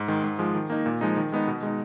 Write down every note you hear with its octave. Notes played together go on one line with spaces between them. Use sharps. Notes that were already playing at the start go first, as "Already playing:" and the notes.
Already playing: G#2
D#3 G#3
G#2
F3 G#3
D#3
A#3 D#4
A#2
F3 G#3 D#4
D#3
G#3 B3 D#4
B2
G#3 D#4